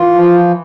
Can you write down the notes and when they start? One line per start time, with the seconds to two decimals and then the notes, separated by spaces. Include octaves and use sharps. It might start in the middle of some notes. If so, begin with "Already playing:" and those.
Already playing: E3 F4
0.14 F3